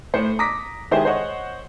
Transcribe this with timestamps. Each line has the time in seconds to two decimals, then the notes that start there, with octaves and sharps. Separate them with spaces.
0.14 A2 C5 C#7
0.39 A#5 D6 D#6 A#6 B6
0.91 D#3 G#3 E4 G4 G#4 C5
1.05 C5 C#5 D#5 F#5 C#6